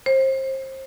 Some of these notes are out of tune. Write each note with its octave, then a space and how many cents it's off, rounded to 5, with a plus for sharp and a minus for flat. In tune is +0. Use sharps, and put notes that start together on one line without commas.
C5 +30